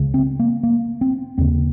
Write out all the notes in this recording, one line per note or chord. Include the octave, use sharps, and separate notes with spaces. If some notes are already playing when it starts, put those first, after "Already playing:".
Already playing: C#2 C#3
C4
A#3
A#3
C4
D#2 C#3 C4